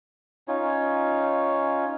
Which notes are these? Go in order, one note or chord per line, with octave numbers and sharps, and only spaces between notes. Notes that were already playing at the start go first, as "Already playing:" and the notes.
C#4 D#4 F4 C#5